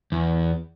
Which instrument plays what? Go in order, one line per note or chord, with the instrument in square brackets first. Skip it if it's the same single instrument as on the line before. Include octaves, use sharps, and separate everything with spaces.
[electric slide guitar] E2